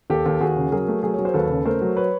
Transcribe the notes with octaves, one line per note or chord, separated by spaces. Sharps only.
D#2 G4 A4
D#2
D#2 F#4 G#4
C#3
F#3 G#4 A#4
A3
F#3 G#4 A#4
F#3 C#5
C5
D#2 A4 B4
C#3
A3 A#4 C5
F#3
B4 C#5